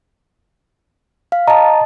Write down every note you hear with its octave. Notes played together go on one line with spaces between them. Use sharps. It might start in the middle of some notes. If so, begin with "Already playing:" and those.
F5
D#5 A5 A#5